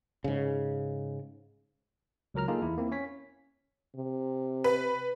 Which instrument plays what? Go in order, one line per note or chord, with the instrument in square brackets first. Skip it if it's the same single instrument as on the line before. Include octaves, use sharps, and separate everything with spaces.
[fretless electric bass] G#2 C#3
[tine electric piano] C#2 F#3 A#4 A#5 F6
A#3 D#4 F4 G#4 A4
E2 E4
A#3 C4 E4
C#4 C#5 B6
[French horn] C3
[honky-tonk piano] B4